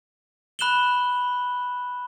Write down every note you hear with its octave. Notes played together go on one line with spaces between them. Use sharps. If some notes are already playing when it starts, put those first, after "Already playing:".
B5 F#6 E7 F#7 G7